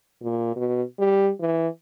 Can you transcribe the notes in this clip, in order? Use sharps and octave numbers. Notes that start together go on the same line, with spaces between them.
A#2
B2
G3
E3